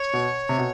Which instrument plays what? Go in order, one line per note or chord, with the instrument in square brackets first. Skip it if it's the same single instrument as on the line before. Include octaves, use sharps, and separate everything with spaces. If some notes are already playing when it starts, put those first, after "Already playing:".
Already playing: [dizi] C#5
[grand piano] B2
C3
B2